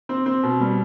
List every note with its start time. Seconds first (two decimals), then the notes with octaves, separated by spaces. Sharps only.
0.09 C4
0.26 C4
0.43 B2
0.60 G3